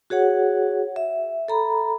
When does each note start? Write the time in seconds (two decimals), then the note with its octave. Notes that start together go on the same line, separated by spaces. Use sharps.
0.10 F#4 G#4 C#5 F#5
0.96 E5
1.48 A4 A#5 B5